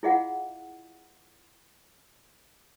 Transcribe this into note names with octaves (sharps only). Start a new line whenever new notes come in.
E4 F4 G#4 D#5 F5 F#5